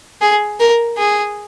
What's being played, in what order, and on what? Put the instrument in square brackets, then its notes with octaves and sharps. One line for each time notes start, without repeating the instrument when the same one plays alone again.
[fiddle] G#4
A#4
G#4